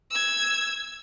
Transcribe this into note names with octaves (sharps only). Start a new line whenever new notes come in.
E6 G#6